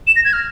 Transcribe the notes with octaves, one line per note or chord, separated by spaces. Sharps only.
E7
A#6
G#6
F6